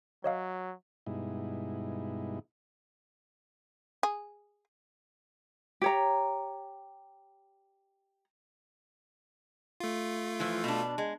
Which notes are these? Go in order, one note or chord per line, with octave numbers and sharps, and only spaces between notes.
F#3 C#5 D#5 F5
G2 B2 G#3 D#4 E4
G#4
G4 C#5 A#5
A3 F4
E3 F3
B2 D4
G#3